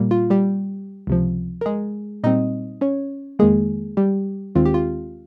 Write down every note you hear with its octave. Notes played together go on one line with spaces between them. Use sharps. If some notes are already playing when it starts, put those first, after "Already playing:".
Already playing: A#2 G3 A#3
F4
G3 G4
C#2 C3 F3
A#4
G#3 G#4
A#2 G3 C4 D#4 D#5
C#4 C#5
F2 D#3 G#3 A#3 G#4
G3 G4
D#2 D#3 G#3 C4 F4
G4
F4